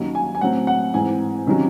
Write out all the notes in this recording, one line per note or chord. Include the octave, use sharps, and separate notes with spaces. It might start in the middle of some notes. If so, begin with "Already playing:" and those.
Already playing: D#2 D#3 F#3 C#4
G#5
G#5
A2 F#3 C4 F#5
F#5
G#2 E3 C4 G#5
C3 D#3 F#3 C#4